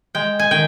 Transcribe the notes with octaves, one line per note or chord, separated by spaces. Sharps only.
G#3 G5
G#5
D#3 G5